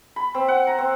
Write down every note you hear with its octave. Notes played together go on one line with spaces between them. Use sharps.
B5
C4
F#5
A#5
C4